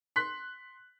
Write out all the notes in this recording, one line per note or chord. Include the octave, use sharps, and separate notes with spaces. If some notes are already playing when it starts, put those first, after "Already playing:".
C6 F#6 B6